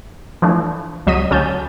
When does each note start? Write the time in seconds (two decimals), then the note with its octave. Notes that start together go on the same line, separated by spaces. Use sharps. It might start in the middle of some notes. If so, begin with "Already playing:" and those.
0.42 E3 F3 A3 D4
1.07 C#2 F#3 D#5 B6 D#7
1.30 D2 F#3 C#4 A5 G6